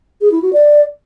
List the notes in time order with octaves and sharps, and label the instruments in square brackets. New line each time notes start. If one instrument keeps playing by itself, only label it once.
[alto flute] G#4
E4
F#4
D5